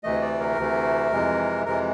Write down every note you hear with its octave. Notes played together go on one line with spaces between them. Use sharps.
D2 C3 E3 A3 D#5
D5
A#4
D2 C3 E3 A3
F2 C3 E3 G#3
F2 C3 E3 G#3 A#4